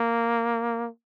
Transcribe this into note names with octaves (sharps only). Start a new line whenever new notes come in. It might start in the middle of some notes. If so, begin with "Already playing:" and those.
Already playing: A#3